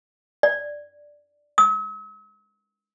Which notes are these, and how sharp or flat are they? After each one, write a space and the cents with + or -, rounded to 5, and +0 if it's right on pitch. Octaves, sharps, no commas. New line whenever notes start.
D5 +0
E6 -45